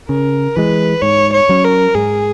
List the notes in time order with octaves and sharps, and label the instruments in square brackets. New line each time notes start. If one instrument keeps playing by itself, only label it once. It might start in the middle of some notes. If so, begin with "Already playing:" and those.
[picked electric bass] C#3 [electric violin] A#4
[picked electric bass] E3 G#3 [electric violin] B4
[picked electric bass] G#2 [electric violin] C#5
[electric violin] C#5
[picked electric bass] F#3 C#4
[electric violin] A#4
[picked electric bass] G#2 [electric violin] G#4